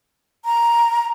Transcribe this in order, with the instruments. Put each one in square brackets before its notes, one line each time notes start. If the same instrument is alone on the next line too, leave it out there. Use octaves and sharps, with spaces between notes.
[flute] A#5